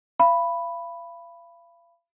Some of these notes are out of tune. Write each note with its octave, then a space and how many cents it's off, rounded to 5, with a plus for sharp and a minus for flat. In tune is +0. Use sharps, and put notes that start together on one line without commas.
F5 -40 B5 +0